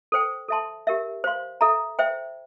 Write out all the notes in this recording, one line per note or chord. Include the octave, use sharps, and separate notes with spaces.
A4 C5 G5
A4 E5 A5 C6
G4 A#4 E5
C5 F5 C6
A4 E5 A#5
C5 E5 G5